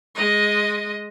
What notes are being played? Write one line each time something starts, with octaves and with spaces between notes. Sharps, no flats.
G#3 D#5